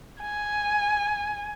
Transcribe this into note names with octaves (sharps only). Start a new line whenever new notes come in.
G#5